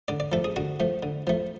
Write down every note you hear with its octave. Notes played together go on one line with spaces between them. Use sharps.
D3 D5
D5
F3 A3 A4
G#4
D3 F#4
F3 A3
D3
F3 A3